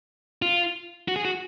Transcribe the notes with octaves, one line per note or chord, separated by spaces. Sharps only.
F4
F#4
G#4
F#4